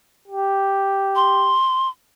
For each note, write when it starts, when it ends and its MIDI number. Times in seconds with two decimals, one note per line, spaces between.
0.28 1.56 67
1.16 1.88 84